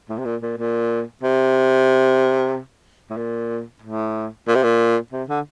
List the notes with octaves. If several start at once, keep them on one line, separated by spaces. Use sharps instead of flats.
A2
C3
A#2
A#2
A#2
C3
A2
A#2
A2
A#2
C3
A#2
C3
D3